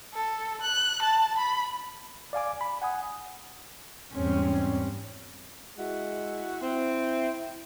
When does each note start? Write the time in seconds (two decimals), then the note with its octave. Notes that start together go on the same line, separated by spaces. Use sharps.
0.13 A4
0.62 F#6
1.02 A5
1.38 B5
2.33 D5 F5 G#5 D6
2.61 B5
2.82 F#5 G#5 D#6
4.14 E2 G#2 G3 C4 C#4
5.78 G#3 E4 F#4
6.62 C4 E4